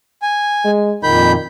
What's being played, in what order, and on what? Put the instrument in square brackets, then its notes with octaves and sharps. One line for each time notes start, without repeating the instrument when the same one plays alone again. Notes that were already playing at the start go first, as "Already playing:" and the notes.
[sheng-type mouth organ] G#5
[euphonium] G#3
[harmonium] F2 A#2 [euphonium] D#3 [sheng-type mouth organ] B5 G6